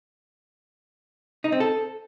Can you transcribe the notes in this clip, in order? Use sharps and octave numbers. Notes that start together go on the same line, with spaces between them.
D#4
C4
A4